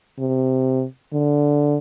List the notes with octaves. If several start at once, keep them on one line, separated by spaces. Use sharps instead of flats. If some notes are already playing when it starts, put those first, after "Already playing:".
C3
D3